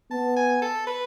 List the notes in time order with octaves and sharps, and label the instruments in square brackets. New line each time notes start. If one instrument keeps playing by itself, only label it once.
[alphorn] B3 [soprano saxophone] A5
[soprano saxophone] G#5
A4
B4